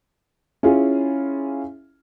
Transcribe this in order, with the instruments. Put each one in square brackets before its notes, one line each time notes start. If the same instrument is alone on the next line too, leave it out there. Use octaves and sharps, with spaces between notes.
[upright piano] C#4 E4 F4 G#4